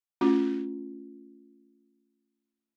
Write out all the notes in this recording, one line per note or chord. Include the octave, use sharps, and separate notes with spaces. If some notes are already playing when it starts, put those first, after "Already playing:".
A3 C#4 F4 F#4